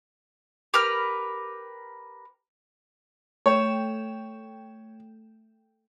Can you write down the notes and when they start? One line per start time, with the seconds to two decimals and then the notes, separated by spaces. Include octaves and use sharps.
0.74 G4 A#4 B4 F6
3.46 A3 C#5 G5 E7